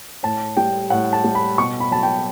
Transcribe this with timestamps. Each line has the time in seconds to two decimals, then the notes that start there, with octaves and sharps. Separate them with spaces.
0.23 A2 A5
0.57 G3 G5
0.90 A2 F#5
1.13 A5
1.24 G3
1.35 B5
1.58 B2 C#6
1.80 B5
1.91 F#3 A5
2.03 G5